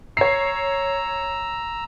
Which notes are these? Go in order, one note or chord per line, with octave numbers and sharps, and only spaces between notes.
C#5 A#5 E6 C7